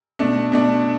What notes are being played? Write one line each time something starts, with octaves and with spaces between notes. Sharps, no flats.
B2 A3 D4
B2 A3 D4